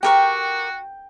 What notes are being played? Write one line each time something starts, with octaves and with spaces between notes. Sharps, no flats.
F#4 G4 A#4 G5 C#6